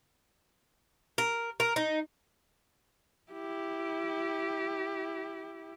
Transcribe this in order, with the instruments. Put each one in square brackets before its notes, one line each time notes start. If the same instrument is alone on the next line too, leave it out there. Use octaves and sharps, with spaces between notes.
[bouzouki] A#4
A#4
D#4
[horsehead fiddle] E4 G4